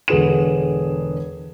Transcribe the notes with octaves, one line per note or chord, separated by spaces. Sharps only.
E1 D3 G#4 B4 E7